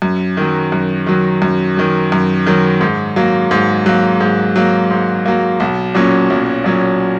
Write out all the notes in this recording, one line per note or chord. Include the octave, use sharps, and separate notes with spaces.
F#2
D#3 F#3
F#2
D#3 F#3
F#2
D#3 F#3
F#2
D#3 F#3
G#2
F#3 A#3
G#2
F#3 A#3
G#2
F#3 A#3
G#2
F#3 A#3
B1
A#2 F#3 C#4
B1
A#2 F#3 C#4